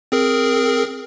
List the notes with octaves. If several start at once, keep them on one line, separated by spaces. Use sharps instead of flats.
C4 G#4 A#4